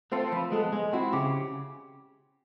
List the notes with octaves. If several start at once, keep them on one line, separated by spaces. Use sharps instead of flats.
A3 C4 F4 A4 C5
F3 B4
G#3 B3 A4
G#3
C4 E4 F#4
C#3 G4